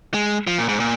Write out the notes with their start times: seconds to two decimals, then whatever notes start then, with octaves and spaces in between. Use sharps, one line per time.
0.14 G#3
0.47 F3
0.58 A#2
0.69 G#2
0.80 A#2